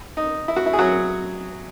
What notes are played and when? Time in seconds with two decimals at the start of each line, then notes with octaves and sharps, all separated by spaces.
0.17 D#4
0.48 E4
0.56 F#4
0.66 E4
0.73 G#4
0.79 F#3 F#4